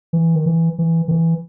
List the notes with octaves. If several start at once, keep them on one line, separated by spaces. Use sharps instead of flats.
E3
D#3
E3
E3
D#3
E3